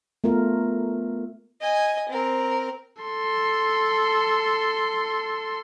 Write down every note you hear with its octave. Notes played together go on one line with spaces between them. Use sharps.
A3 B3 F4 A#4
D#5 G#5
C4 A#4
A4 C6